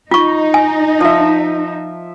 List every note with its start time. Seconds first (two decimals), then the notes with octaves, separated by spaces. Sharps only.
0.11 D#4 F4 C#6
0.54 G#5
1.00 F3 E5